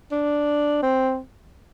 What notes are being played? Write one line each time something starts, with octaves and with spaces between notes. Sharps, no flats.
D4
C4